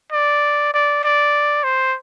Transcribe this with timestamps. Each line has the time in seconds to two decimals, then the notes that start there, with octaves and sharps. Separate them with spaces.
0.12 D5
0.74 D5
1.04 D5
1.64 C5